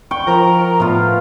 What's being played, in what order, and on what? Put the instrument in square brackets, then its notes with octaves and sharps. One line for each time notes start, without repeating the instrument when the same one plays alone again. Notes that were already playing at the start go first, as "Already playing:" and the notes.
[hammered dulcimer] G5 [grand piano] C#6
[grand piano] F3 C#6 [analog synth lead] A#4 [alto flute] A#5
[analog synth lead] A2 [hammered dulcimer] B3 F4